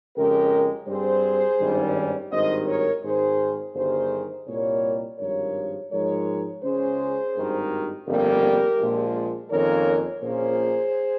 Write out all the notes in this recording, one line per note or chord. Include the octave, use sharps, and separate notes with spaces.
F2 C#3 G#3 G4 A#4
G2 G3 C4 G#4 C5
G#1 G2 D#3 G3 C#4
G#1 G2 D#3 C5 D#5
A#4 C#5
G#1 G#2 D#3 G#4 C5
G1 G2 D#3 G#4 C5
C2 A#2 G3 A#3 A#4 C#5
G#1 G2 F3 A#4 C#5
G#2 F3 G#3 A#4 C#5
C#2 C#3 G#3 C#4 G#4 C5
G#1 G2 D#3 A#3
G1 F2 C#3 G3 A#3 G4 A#4
A#1 A#2 F3 G#3
F2 D#3 A#3 C#4 A#4 C#5
A#1 A#2 F3 A#3 C#4 G#4 C5